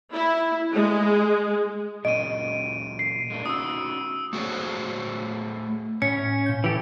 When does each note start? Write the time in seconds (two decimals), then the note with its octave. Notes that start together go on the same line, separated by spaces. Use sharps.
0.12 E4
0.72 G#3
2.05 A#2 F#3 C#4 D#5 D7 D#7
2.99 C7
3.30 G#3 A#3 D4
3.46 C#4 D#4 F#4 D#6 E6
4.33 A3 F#4 G#4 C5 C#5
6.02 A2 C#4 C#5 B6 C#7
6.46 A#2 G6
6.64 E3 F#3 G4 A4